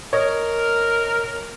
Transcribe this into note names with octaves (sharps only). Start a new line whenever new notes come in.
A#4 C#5 D#5